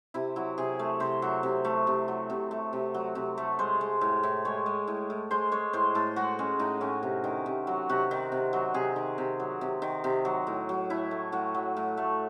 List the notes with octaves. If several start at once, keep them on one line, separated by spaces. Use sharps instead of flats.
C3 E4
F#3 E4
C3 G#4
A3
C3 C5
F#3
C3
A3
C3
F#3
C3
A3
C3
F#3
C3
A3
G#3 C5
G#3
A2
A2
G#3 C#5
G#3
A2
A2
G#3 C5
G#3 C#5
A2 C5
A2 A4
G#3 F#4
G#3 C#4
A2 D#4
A2 C#4
C3
D#3
C3
F#3
C3 F#4
D#3
C3
F#3
C3 G#4
D#3
C3
F#3
C3
D#3
C3
F#3
A2
F#3
A2 E4
A3
A2 F#4
F#3
A2
A3